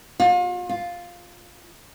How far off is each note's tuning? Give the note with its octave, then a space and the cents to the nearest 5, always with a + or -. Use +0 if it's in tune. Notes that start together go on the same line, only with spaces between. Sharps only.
F4 +40
F4 +5